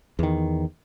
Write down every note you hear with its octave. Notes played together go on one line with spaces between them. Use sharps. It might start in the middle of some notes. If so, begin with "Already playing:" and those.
E2 D#3